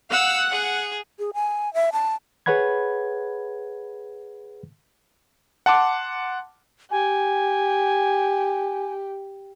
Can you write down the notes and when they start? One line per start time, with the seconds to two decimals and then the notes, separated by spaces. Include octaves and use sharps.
0.11 F5 F#5 E6
0.51 G#4
1.19 G#4
1.34 G#5
1.74 E5
1.93 A5
2.46 G#4 B4 C#5 F#5 B5 G#6
5.66 F#5 A5 C6 D6
6.91 G4 G#5